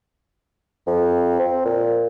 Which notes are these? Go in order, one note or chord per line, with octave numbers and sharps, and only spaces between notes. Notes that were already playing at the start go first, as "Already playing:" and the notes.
F2
C4
A#2